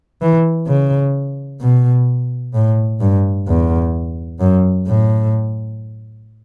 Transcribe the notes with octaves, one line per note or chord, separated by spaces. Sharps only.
E3
C#3
B2
A2
G2
E2
F#2
A2